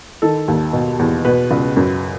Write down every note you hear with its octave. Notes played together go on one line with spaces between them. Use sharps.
D#3 A4
D#2
B2
E2
B2 B4
C#2
F#2